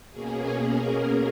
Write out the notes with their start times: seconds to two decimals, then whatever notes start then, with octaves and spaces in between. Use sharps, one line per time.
0.11 B2 A#3 C#4 G#4
0.65 A#4